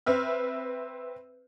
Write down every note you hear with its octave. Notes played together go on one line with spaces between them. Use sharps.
C4 B4 E5 F6